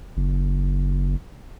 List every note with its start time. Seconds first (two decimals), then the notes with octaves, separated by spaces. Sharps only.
0.17 F#1